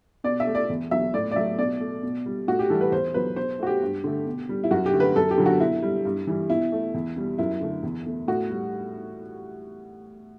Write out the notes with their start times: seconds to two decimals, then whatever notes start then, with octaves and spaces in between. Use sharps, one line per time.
0.24 B2 D5
0.40 E5
0.47 A3
0.55 D5
0.69 E2
0.91 B2 F#3 E5
1.14 A2 D5
1.31 D5
1.36 F#3 A3 E5
1.59 B2 D5
1.80 A3
2.03 B2
2.26 G3
2.48 A2 F#4
2.59 G4
2.70 E3 G3 A4
2.81 B4
2.92 E2 C5
3.14 B2 F#3 B4
3.36 B2 C5
3.59 A3 F#4
3.67 G4
3.82 G2
4.04 D3 A3
4.26 B2
4.49 G3
4.64 E4
4.71 F#2 F#4
4.86 G4
4.93 D3 A3
5.00 B4
5.15 F#2 A4
5.31 G4
5.38 D3 F#3
5.46 F#4
5.60 B2 E4
5.82 G3
6.05 G2
6.27 E3 G3
6.50 B2 E4
6.72 A3
6.94 E2
7.16 B2 G3
7.38 F#2 E4
7.61 D3 A3
7.83 E2
8.06 B2 A3
8.28 A2 F#4
8.50 G3